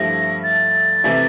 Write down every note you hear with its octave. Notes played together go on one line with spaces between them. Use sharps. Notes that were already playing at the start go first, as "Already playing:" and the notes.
Already playing: G2 F3 A3 E4 G4 A#6
A6
C3 E3 A3 E4